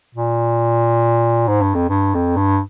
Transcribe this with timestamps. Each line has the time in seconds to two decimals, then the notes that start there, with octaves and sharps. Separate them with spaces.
0.15 A#2
1.48 G#2
1.62 G2
1.75 F2
1.89 G2
2.14 F2
2.36 G2